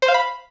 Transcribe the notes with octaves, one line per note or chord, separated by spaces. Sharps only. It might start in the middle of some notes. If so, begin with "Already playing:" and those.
C5
F5
B5